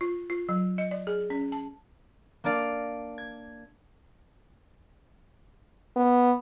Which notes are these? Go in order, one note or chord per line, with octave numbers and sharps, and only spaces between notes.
F4
F4
F#3
D#5
D5
G#4
C#4
A5
A#3 D4 A#4 D5 F5
G#6
B3